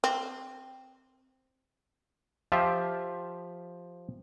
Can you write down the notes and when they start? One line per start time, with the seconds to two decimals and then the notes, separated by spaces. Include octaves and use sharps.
0.04 C4
2.52 F3 F4 G4 E5